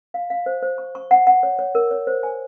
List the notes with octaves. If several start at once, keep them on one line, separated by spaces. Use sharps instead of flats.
F5
F5
C5
C5
C#6
C#6
F#5
F#5
C#5
C#5
A#4
C#5
C5
G#5